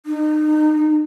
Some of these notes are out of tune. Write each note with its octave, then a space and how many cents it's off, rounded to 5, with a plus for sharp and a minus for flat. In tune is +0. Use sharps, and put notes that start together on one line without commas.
D#4 -30